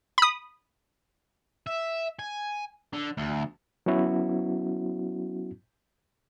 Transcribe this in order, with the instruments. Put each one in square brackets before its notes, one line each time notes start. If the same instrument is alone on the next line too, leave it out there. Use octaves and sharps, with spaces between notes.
[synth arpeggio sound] B5 D#6
[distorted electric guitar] E5
G#5
D3
D2
[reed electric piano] F#3 B3 C#4 E4 F#4